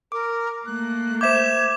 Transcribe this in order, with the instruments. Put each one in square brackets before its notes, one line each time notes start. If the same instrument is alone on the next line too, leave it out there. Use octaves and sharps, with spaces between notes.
[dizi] A#4 [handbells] D6
[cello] A3 A#3 [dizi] F#6
[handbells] C5 E5 G6 [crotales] D6 E7 [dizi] G#6